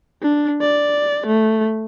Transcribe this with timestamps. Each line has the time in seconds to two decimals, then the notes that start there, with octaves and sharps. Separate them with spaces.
0.22 D4
0.61 D5
1.26 A3